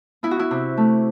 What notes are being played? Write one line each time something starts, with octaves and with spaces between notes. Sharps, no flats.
B3 E4
F#4
E4
C3
A3